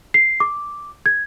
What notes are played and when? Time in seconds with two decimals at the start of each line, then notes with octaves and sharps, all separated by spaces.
0.14 C7
0.40 D6
1.06 G#6